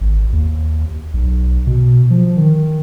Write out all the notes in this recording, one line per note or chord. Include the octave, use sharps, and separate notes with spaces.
G#1
D#2
B1
B2
F3
D#3